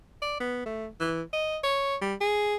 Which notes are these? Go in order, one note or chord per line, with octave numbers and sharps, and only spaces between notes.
D5
B3
A3
E3
D#5
C#5
G3
G#4